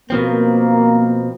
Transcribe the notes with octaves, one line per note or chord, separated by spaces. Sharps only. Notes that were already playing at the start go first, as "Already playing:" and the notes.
B2 F3 A#3 C4